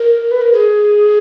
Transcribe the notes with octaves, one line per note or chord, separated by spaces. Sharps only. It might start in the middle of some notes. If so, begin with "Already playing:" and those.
Already playing: A#4
B4
A#4
G#4